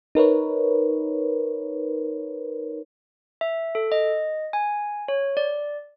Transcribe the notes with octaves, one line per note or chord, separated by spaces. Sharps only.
D#4 A#4 B4 C#5
E5
A4
D#5
G#5
C#5
D5